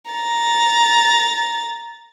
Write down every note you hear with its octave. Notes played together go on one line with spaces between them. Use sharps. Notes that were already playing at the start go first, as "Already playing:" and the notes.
A#5 A6